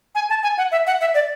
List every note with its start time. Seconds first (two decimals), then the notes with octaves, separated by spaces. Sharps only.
0.15 G#5
0.29 A5
0.43 G#5
0.57 F#5
0.71 E5
0.87 F#5
1.01 E5
1.14 D5